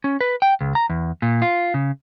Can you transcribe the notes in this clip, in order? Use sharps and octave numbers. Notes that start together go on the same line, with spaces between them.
C#4
B4
G5
C#2
A#5
E2
A#2
F4
C#3